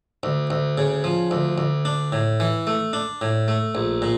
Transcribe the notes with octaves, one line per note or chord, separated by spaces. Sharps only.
D2
D2
C#3
F3
D2
D2
D4
A2
E3
A3
D4
A2
A3
A#1
A#2